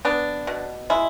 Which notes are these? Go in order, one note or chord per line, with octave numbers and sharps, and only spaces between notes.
B3 D4
B2
G#3 E4